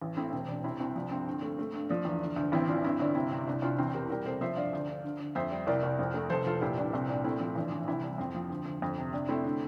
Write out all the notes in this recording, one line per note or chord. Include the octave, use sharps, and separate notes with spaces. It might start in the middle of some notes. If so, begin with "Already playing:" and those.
A1
A3 C4 E4
E1 C4
E1 D4
C3 C4 E4
C2 C4
F3 D4
G2 C4
D3
A3
A3
G2
F3 D4
E2
D3
D2
A1 C4 E4
E3 D4 F4
G2 C4 E4
G1 D4
C3 C4 E4
C3 C4
C2 D4
C2 D4 F4
E2 C4 E4
E1 G4 A#4
G3 G4 A#4
C3 A4 C5
F3 C5 E5
G2 D5 F5
D2
D3
D3
D3
F2 C5 E5
G3
C2 A#4 D5
C2
F2
A3
F1 A4 C5
F1 F4 A4
A#2 E4 G4
C2 D4
C2 C4
A#2 D4
A3 C4 E4
F3 C4
A1 D4
E3
C2 C4 E4
G3
F2 C4
F3
D2
D2
F2
C3
C3 D4
A3 C4 E4
D3